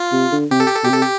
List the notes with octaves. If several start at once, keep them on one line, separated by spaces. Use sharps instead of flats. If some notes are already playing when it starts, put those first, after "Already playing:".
Already playing: F4
C3
D3
C3 G4
A4
G4
A4
B2 G4
C3 A4
G4